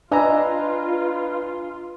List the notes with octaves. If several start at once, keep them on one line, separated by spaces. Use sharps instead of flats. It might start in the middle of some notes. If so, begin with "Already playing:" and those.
D4 F4 B4 D#5 G#5 A#5 E6